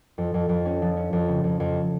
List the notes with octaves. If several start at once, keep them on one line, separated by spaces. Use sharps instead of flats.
F2
F2
F2
C#4
F3
C#4
F2
C#3
F2
F2